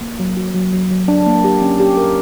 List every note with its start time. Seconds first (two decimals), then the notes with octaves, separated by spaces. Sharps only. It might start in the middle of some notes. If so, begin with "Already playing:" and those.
0.01 A#3
0.19 F#3
0.37 F#4
0.55 F#3
0.73 F#3
0.91 F#3
1.08 D4
1.26 A#3
1.44 G4
1.62 C#4
1.80 G4
1.97 A#4